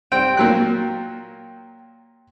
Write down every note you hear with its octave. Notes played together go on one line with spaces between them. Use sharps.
G3 C4 G5
A#2 F#3 F#6